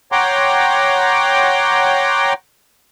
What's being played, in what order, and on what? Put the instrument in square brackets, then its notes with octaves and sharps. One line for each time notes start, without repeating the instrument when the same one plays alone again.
[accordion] C#5 F#5 G5 A#5 C6 D6